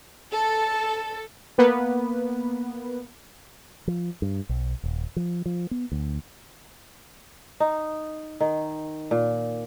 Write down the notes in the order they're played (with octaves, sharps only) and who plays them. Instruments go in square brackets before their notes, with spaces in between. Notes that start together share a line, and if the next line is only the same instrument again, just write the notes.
[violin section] A4
[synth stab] A#3 B3 B4
[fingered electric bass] F3
G2
B1
D#1
F3
F3
B3
D2
[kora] D#4
D#3
A#2